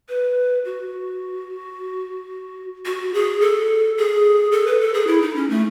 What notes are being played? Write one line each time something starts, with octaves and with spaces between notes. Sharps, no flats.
B4
F#4
F#4
G#4
A4
G#4
A4
B4
A4
G#4
E4
D#4
C#4
A3